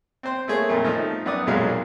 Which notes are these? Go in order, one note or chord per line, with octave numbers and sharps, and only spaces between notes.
C4 C5
A3 A#3 G#4 C#5
F2 A#2 A3
F3 A3 D#4
F#2 B3 D5 D#6
B1 F2 A#2 F#3 G#3 F5